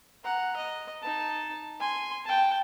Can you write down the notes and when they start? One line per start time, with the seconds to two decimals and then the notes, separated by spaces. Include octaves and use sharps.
0.24 F#5 A#5
0.57 D#5
1.02 D#4 A5
1.80 G#5 C6
2.25 G5 A5